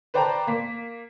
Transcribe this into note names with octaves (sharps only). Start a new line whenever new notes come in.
B4 C5 D5 G5 A5 A#5
A#3 B6